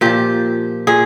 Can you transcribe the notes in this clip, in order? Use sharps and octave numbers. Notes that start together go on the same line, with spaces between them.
A#2 F3 G4
A#2 G#4